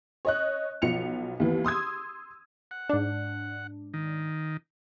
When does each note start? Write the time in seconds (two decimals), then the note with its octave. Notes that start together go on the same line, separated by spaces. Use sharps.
0.25 C#5 D#5 F#6
0.82 B1 F3 C#7 F7
1.40 D#2 E3 B3
1.65 C6 D#6 E6 G#6
2.71 F#5
2.89 G#2 D4
3.94 D#3